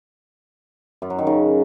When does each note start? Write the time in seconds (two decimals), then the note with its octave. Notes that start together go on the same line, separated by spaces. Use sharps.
1.02 F#2
1.10 F#3
1.18 D#3
1.27 C#3